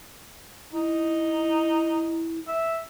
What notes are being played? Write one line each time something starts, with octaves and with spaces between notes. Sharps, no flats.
D#4 E4
E5